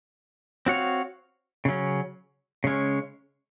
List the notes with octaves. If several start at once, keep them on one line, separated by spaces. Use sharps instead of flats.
C4 F#4 C#5 F5
C#3 F#3 C#4
C#3 G#3 C#4